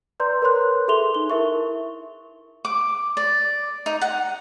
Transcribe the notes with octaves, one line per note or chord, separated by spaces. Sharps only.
B4 D5 A#5 C6 G6
A#4 B4 C#5 B5 C6 F#6
G#4 A4 E5 C6 F7 G7
D#4 G7
E4 A#4 E5 C#6
D6
D5
D#4
F#5